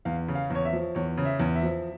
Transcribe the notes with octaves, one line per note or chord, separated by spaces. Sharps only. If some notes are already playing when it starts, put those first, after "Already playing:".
E2 F5
C#3
F5
E2 C#5
E5
F3
E2 C#5
C#3
E5
E2
E5
F3